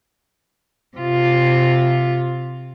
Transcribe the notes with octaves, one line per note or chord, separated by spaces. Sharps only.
C3 F4